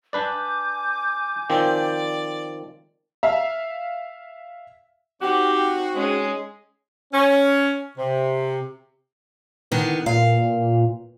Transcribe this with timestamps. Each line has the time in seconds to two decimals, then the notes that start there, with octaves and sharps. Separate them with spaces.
0.13 D4 B4 D5 G#5 D6 G6
1.50 D#3 F3 C4 D5
3.23 E5 F5
5.22 C4 D#4 F#4 G4
5.95 G#3 C#4 G#4
7.13 C#4
7.97 C3
9.72 D3 D#3 B3
10.06 A#2 F5